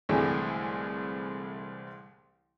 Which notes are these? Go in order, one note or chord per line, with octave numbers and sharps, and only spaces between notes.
C2 A2 D3 E3 G#3